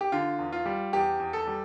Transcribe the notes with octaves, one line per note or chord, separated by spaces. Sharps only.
G4
D3 F4
E2
F4
G3
E2 G4
E2
A4
G3